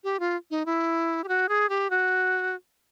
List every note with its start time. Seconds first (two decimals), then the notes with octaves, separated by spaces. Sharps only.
0.04 G4
0.20 F4
0.51 D#4
0.66 E4
1.24 G4
1.28 F#4
1.49 G#4
1.69 G4
1.90 F#4